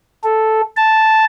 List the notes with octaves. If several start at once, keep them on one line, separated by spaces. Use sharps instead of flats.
A4
A5